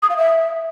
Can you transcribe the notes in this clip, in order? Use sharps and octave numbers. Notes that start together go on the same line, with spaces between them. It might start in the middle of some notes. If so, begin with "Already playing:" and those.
D#6
F5
E5